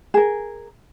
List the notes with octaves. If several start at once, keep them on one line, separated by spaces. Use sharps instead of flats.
G#4 A#4